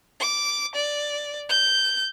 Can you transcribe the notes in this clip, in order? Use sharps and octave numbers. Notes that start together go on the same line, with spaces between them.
D6
D5
G6